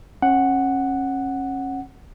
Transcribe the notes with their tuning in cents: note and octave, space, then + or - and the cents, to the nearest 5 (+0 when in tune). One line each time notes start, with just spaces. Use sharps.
C#4 -30 F#5 +0